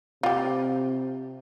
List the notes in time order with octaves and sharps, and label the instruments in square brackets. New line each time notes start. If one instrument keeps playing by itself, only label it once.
[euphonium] C3 [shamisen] F4 G4